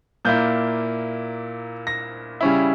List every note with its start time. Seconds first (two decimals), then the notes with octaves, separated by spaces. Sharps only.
0.25 A#2 A#3 E4 G6
1.87 A#6
2.41 C#3 G3 C#4 E4